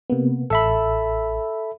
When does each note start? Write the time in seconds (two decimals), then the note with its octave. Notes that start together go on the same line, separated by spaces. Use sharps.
0.10 C3 A#3 B3
0.50 A1 A4 E5 B5